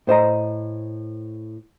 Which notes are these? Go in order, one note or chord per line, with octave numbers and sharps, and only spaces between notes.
A2 C5 D#5 A#5